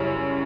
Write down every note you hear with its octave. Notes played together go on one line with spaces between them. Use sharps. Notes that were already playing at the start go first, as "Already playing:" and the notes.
Already playing: F#2 C#3 G3 C#4 E4